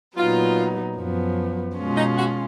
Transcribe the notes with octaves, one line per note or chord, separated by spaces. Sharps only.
A#2 F#3 B3 D#4 F4
F#2 F3 B3
B2 G#3 C#4 F4
D#4
F#4